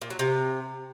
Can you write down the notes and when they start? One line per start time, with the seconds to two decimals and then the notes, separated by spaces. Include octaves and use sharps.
0.02 A#2
0.10 F#3
0.19 C3